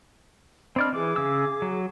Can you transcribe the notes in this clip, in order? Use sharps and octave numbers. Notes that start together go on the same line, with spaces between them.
C4 D4 D5 D#5 B5 F6
E3 G#4 D6
C#3 E6
F#3